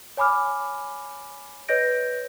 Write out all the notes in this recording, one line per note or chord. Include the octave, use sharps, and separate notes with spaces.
C#5 G#5 B5 D6 F6
B4 C#5 D#5 G6 A#6 D7